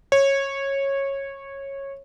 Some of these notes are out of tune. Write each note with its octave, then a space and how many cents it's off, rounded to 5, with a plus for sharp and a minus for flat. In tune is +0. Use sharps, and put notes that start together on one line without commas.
C#5 -15